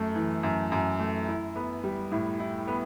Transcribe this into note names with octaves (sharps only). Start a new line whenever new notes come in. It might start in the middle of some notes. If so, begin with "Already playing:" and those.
Already playing: F#2 A3
E3
F#2
F#2
A3
E4
B3
G3
A2
E4
B3